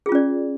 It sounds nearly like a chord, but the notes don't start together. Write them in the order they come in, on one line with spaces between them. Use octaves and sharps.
G#4 F4 C#4 D5